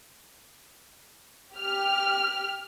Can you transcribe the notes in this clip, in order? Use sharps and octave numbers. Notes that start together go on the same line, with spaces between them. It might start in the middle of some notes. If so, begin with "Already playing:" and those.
G4 F6